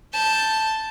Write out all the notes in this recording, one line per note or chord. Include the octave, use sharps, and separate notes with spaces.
A5 G6